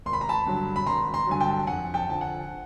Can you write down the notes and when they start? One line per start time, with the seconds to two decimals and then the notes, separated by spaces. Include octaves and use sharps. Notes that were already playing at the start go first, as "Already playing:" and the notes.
0.06 G#1 C6
0.13 B5
0.21 A#5
0.29 A5 B5
0.46 G2 D3 F#3
0.76 B5
0.86 G#1 A#5 C6
1.14 A#5 C6
1.27 G2 D3 F#3 G#5
1.41 G5 A5
1.67 F2 F#5 G#5
1.94 G5 A5
2.08 D3 F3 A5
2.21 F#5 G#5